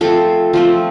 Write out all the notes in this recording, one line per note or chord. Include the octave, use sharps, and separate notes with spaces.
F3 A3 C4 A4
F3 A3 C4